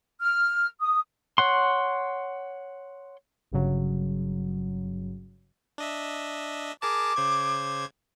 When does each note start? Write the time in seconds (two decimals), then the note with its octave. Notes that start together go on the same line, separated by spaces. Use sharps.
0.21 F6
0.80 D#6
1.38 C#5 F#5 C6
3.51 G1 G2 C#3 F#3
5.78 D4 D#5 E5
6.82 G#4 A#4 A5 D6
7.16 C#3 C5 G#6